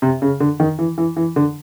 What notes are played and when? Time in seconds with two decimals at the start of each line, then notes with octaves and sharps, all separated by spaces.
0.02 C3
0.22 C#3
0.40 D3
0.60 D#3
0.79 E3
0.98 E3
1.17 E3
1.36 D3